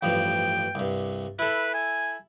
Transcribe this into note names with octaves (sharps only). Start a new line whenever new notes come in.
A1 G2 F3 G5
C2 G2
E4 A4 B4
G#5